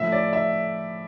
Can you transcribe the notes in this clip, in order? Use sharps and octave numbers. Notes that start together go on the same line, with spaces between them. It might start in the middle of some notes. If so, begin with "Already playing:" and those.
Already playing: A2 F3 E5
D5
E5